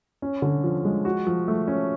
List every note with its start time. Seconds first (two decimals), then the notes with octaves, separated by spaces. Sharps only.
0.22 C#4
0.42 D3
0.64 F3
0.85 G#3
1.05 F#4
1.27 F3
1.48 A3
1.68 C#4